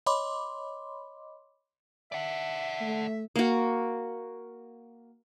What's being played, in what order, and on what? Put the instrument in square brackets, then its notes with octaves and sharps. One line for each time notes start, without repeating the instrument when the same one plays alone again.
[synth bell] C#5 D#5 B5 C6 D6
[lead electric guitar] D5 F#5 [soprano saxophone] E5
[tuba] A3
[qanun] A#3 F#4